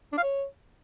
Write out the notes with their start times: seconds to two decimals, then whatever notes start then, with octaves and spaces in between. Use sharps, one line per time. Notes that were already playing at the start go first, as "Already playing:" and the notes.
0.12 D4
0.18 F5
0.23 C#5